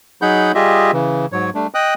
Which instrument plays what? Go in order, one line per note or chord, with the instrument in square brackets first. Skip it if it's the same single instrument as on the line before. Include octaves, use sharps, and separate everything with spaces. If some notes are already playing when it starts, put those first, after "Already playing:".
[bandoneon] F#3 D#4 G#4 F#5 B5 G6
G3 F4 G4 G#4 D#5 E5
C#3 E3
G#2 F#3 C#5
G3 A3 D4
D#5 G5 D#6 F#6